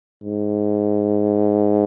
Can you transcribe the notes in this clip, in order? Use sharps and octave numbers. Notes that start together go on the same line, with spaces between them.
G#2